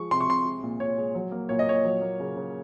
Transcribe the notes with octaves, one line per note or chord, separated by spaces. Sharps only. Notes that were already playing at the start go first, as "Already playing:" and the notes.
Already playing: F3 G#3 C#6
C3 C6
C#6
C3 C6
G#3
A#2
A#2 C#5
G#3
F#3
A#3
A#2 C#5
D#5
A#2 C#5
F#3
A#3
C#3
C#3